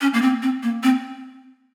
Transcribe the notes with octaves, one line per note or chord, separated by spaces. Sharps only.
C#4
A#3
C4
C4
A#3
C4